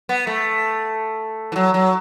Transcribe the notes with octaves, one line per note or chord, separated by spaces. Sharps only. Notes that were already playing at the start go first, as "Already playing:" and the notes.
B3
A3
E3
F#3
F#3